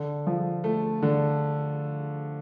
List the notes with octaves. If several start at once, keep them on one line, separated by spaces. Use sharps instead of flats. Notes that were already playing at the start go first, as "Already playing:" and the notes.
Already playing: D3
F3
A3
D3